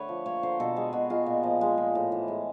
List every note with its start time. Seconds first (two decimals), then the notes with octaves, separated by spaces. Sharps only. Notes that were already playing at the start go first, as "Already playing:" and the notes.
Already playing: D3 A3 B4 C#5
0.09 F3
0.26 A#3 C#5
0.43 D3 C5
0.60 B2 A4
0.76 G#3 G#4
0.93 B2 F#4
1.10 G#3 F4
1.26 A#2
1.43 F3
1.61 G#3
1.78 A#2
1.95 A2
2.12 E3
2.28 G#3